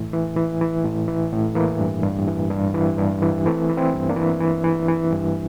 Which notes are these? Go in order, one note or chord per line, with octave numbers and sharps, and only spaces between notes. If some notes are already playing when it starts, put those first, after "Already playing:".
Already playing: A2 E3 A3
E3
E3
E3
A2
E3
A2
E3 A#3
G2
G2
E3
G2
E3
G2
E3
E3 A3 C4
E3
C4 E4
G2
A#3 D4
E3
E3
E3
E3
G2